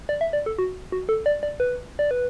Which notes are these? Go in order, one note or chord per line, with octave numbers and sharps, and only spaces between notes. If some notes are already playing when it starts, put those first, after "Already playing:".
D5
E5
D5
A4
F#4
F#4
A4
D5
D5
B4
D5
B4